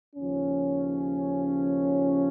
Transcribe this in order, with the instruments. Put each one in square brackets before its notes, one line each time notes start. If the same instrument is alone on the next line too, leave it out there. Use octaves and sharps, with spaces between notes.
[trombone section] D#2 C#3 F3 C#4